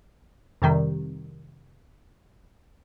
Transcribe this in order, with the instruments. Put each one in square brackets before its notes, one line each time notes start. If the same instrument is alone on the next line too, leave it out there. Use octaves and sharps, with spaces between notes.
[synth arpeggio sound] F2 C3 D#3 G3